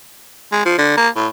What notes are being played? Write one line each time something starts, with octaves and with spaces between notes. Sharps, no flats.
G#3
F3
D3
A#3
A2